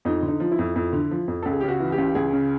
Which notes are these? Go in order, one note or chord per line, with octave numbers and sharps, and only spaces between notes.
F2 D#4
D3
D#4
F3
E4
F2
F2
D3
F3
F2
C#2 A4
G#4
C#3 G4
F#4
E3
G4
C#2
C#2 G#4
C#3